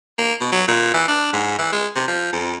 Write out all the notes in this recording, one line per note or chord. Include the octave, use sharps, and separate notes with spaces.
A#3
B2
F#3
A#2
E3
D4
G#2
E3
G#3
C3
F3
F2